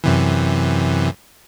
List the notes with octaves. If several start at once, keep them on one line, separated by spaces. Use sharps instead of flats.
F#2 C3 E3